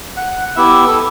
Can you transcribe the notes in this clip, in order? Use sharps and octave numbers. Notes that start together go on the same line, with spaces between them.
F#5
B3 E4 G4 E5
A4